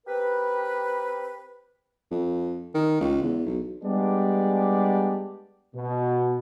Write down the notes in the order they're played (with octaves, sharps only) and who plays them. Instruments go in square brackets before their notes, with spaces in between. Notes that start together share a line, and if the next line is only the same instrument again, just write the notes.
[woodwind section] C4 G4 A#4 B4
[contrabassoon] F2
D#3
C#2
E2
B1
[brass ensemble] G3 G#3 B3 D4 G4 D5
B2